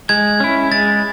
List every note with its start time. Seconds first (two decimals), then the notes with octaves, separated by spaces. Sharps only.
0.09 G#3 G#6
0.40 C#4 E4
0.71 G#3 A6